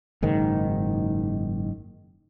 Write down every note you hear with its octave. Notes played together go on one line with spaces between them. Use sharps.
F#1 G#2 D#3